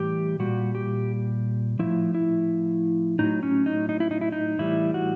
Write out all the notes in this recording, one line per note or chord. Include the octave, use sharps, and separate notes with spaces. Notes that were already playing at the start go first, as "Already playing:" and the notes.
Already playing: A2 E3 G3 G4
A#2 G3 F#4
G4
A2 F3 E4
E4
A2 F#3 D#4
C#4
D#4
D#4
E4
D#4
E4
D#4
A2 E3 G3 E4
F#4